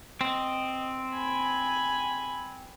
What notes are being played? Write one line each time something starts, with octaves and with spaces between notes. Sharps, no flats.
C4 D#5
G#5 B5